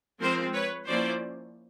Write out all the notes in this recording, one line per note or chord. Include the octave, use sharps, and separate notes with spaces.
F3 G#3 C4 A#4 C5
B4 C#5
F3 A#3 C#4 E4 C5 D5